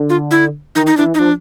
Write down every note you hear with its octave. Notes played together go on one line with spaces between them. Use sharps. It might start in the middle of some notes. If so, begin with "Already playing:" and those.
Already playing: D3
F4
E4
D#3 D#4
D#4
E3 D4
D#4
F3 D4